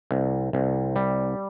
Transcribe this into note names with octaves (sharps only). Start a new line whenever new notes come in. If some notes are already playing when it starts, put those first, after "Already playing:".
C2
C2
G3